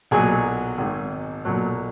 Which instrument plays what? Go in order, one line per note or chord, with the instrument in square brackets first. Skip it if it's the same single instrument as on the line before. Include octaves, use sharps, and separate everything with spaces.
[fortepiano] B1 A#2 F#3 G#4 G#5
G#1 G#2 D#3
B1 A#2 F#3